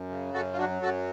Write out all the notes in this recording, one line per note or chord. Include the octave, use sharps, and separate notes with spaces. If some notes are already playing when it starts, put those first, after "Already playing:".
Already playing: F#2
C#3
F#2 F#4 A4
F4
F#3 D4 F#4
F#2 F#4 A4